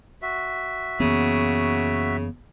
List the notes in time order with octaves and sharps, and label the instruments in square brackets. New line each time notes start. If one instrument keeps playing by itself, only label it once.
[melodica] F#4 E5
[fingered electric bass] F#2 E3 A#3 [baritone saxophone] C#3 [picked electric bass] B3